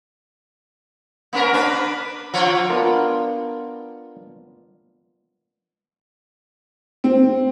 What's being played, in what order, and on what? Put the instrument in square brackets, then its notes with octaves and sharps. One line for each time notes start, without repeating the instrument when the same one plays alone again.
[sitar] A#3 C#4 A#4
D4 B4
F3 F4 C#5
[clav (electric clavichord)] B3 D4 F4 A#4
[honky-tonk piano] C4